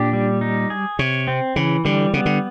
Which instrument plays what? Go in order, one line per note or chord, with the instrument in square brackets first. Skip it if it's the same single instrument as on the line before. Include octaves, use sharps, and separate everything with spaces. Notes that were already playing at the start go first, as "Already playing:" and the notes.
Already playing: [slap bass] A#2 [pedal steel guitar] D4 G4
[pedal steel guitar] G3
D#4
G#4
[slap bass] C3 [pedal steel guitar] C#5
[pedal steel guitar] C4
[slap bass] C#3 [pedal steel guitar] E3
[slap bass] D3 [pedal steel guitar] G3
[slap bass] C#3 [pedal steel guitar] B3
[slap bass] D3